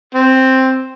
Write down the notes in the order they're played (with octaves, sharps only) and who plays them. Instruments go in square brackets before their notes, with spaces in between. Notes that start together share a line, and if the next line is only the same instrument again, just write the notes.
[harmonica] C4